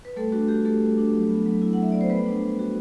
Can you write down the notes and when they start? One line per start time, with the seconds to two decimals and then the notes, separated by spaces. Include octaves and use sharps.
0.05 B4
0.16 G3 A3 A4
0.32 D4 F#4
0.48 G3 G4
0.65 A3 F#4 A4
0.81 G3
0.97 D4
1.13 F#3
1.29 B3
1.46 F#3
1.62 E4
1.73 F#5
1.78 F#3 E5
1.92 B3 D5
2.01 C5
2.10 G3 B3 B4
2.26 D4
2.42 G3
2.59 F#4